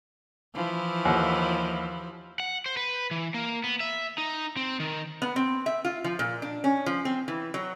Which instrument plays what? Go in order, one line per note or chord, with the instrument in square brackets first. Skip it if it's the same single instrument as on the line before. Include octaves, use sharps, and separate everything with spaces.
[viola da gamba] E3 F3 E4
[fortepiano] D#2 F#5
[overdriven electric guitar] F#5
C5
B4
E3
A#3
B3
E5
D#4
C4
D#3
[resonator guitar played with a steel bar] B3
C4
E5
F4
F3
A#2
D4
C#4
F3
C4
E3
F#3